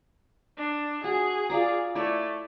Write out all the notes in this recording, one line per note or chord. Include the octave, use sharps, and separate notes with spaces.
D4
F#4 G#4
F4 D5 A#5
A3 E4 C#5 D5